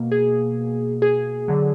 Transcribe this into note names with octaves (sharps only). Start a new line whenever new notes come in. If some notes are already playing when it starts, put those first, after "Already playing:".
Already playing: B2 A#3
G#4
G#4
D3 F#3